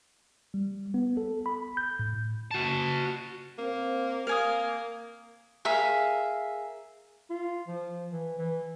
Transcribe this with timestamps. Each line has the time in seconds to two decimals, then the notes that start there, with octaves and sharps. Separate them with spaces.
0.54 G3
0.94 B3
1.17 A4
1.46 B5
1.77 G6
1.99 A2
2.51 F#4 A5
3.58 A#3 C4
4.27 A#3 F5 G#5 D#6
5.65 G#4 A#4 E5 F5
7.30 F4
7.68 F3
8.11 E3
8.39 E3